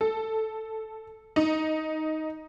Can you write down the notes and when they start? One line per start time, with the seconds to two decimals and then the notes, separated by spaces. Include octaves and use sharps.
0.01 A4
1.36 D#4